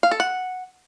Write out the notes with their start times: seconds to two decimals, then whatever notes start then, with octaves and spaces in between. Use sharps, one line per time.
0.03 F5
0.11 A4
0.20 F#5